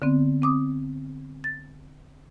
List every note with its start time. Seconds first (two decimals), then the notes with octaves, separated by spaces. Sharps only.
0.02 D3 B3 C4
0.42 C4 D6 D#6
1.44 A6